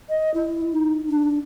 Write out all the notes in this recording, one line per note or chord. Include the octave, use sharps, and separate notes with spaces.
D#5
E4
D#4
D4